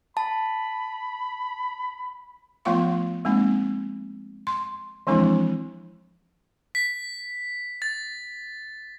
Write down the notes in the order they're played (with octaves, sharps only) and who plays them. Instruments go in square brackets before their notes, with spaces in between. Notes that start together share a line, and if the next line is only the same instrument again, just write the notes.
[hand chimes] A5 [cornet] B5
[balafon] F3 A3 B3 F4 F5 C6
G#3 A#3 C4 D#4
C6
E3 F3 G#3 C4 D4 E4
[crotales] B6
A6